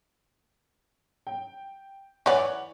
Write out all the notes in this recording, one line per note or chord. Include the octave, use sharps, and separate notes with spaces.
G5
E3 C#5 D5 F#5